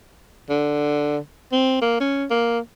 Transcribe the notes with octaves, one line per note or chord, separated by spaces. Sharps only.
D3
C4
A#3
C#4
A#3